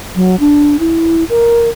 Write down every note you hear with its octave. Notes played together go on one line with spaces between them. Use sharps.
F#3
D4
E4
A#4